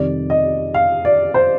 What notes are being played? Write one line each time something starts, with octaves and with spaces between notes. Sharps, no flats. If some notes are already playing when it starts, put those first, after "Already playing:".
Already playing: F2 C3 D#3 G3 D5
D#5
F5
D5
C5